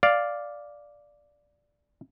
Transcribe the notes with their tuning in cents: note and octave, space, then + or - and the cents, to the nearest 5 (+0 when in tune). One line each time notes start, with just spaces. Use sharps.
D5 +0 F5 +0